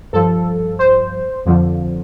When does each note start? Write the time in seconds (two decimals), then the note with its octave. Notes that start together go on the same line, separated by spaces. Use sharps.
0.13 G2 F3 A4
0.79 C5
1.45 F2 D3 F3